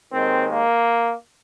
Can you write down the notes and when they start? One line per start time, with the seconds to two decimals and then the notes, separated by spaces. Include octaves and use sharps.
0.12 D#2 D#3 G#3 C4
0.48 A#3